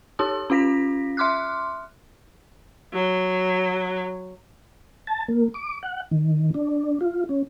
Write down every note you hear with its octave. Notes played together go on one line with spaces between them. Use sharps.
D#4 G4 A5 D#6
C#4 F4 F5 A#6 B6
E5 C6 D6 F6 F#6
F#3
A5
A#3
D6
F#5
D#3
D4
F4
C#4